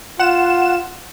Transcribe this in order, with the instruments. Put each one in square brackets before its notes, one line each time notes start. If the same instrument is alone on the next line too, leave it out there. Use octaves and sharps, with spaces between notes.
[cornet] F4 [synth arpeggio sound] F#5 E7